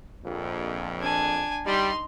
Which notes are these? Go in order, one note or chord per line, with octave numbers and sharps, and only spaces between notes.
A#1 F2
D4 G#5
G3 D#4 C6